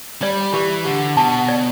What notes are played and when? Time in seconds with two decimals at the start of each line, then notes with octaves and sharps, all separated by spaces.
0.22 G3 D5
0.54 E3 G4
0.85 D3 G4
1.17 B2 A5
1.48 D5